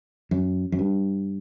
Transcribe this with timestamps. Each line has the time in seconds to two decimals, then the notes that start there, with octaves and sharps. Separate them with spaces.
0.31 F#2
0.72 F#2
0.79 G2